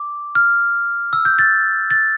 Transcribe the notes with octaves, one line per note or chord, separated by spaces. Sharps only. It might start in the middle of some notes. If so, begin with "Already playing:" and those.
Already playing: D6
F6
E6
G6
A6
A6